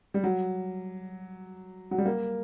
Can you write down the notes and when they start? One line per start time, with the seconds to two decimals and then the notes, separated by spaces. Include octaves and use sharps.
0.14 G3
0.24 F#3
1.91 F#3
1.98 G3
2.06 A#3